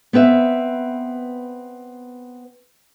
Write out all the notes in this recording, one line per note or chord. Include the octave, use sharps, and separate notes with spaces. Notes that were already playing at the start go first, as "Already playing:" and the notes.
B3 C4 B4 E5